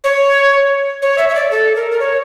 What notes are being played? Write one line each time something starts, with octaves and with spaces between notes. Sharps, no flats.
C#5
C#5
E5
E5
D5
A4
A#4
A#4
C#5